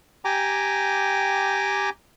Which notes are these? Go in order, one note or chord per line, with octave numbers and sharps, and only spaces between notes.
G4 G5 G#5 A#5 D6